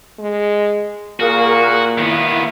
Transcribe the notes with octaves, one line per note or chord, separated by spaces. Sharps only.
G#3
A#2 A#3 F#4 G#4 A#4
D#3 A#3 B3 E4